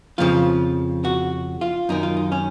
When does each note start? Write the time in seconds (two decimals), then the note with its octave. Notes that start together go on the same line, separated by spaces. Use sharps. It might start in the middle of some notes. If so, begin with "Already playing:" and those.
0.18 F2 C#3 F3 F4
1.05 F#4
1.61 F4
1.89 F#2 D#3 D#4
2.03 F4
2.17 D#4
2.32 C#4